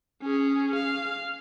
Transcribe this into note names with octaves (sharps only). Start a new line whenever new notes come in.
C#4 G#4
F5